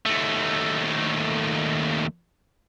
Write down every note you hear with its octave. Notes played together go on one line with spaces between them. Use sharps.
D#2 A3